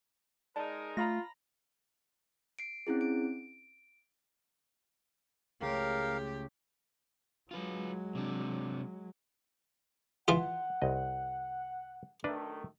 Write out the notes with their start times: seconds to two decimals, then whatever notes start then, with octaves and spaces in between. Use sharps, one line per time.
0.56 G#3 D#4 A#4 D5 A5
0.97 A3 F4 A#5 B5 A#6
2.59 C7 D7
2.87 C4 C#4 E4 G#4
3.01 D7
5.62 C#2 A3 G4 A#4 F5
7.51 F#3 G#3 F4 B4
8.15 C3 D4
10.28 E3 F4 E5 F#5
10.82 C2 D#5
12.24 F#2 D#3 A3 D4 B4